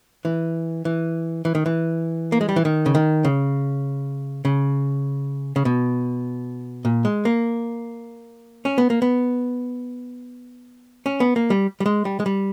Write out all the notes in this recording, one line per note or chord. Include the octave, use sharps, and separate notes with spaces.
E3
E3
E3
D#3
E3
A#3
G#3
G3
E3
D#3
C#3
D#3
C#3
C#3
C#3
B2
A#2
G#3
A#3
C#4
B3
A#3
B3
C#4
B3
A#3
G3
G3
G#3
G3
G#3
G3